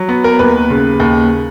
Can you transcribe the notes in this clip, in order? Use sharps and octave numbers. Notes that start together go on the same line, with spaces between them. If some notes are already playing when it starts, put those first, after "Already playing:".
Already playing: F#3
B3
A#4
D#2 B4
C#3
D#2